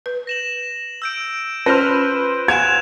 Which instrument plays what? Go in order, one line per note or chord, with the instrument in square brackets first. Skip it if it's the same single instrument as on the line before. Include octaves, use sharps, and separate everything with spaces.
[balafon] B4
[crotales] A#6 E7 F#7
E6 G6 D7
[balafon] C#4 F4 [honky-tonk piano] B4 C5 F6
[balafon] F5 F#5 G#5 [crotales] F#6 E7 F7 [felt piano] G#6